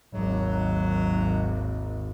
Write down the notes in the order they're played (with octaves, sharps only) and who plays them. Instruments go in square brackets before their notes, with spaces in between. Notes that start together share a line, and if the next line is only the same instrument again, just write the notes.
[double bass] G#1 D#2 [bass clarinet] F#3